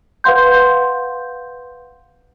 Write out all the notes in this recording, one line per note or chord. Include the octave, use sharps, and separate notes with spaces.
B4 F5 F#5 C6 G6